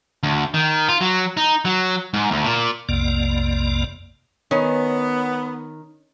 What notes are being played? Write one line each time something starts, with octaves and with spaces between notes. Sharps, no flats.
D2
D#3
F4
F#3
D#4
F#3
G#2
D2
A#2
B1 F2 C3 A#3 D5
D#3 B3 C#4